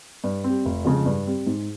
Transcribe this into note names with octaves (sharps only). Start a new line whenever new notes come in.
G2
G3 C4
F1
F2 C#3 F3 G#3
G2
G3 C4
G#2